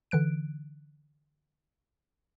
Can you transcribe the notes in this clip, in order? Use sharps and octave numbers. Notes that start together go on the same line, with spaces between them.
D3 E3 F#6 D7